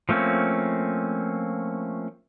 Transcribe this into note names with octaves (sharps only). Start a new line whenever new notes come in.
F3 A3 A#3 C4 C#4